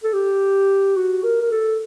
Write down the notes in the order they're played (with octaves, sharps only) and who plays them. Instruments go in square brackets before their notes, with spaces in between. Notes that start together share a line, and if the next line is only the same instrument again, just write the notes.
[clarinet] A4
G4
F#4
A#4
A#4
A4